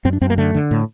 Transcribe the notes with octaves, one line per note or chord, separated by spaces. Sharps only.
F#2 C4
D4
F#2 C4
A#3
D3 A3
D3
A2